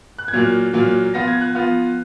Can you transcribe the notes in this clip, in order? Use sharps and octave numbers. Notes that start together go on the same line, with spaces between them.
F#6
G#6
A#2 F#3 A#3 F#6
A#2 F#3 A#3
F3 B3 F4 A#6
G#6
F#6
F3 B3 F4